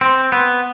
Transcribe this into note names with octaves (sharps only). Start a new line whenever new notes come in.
C4
B3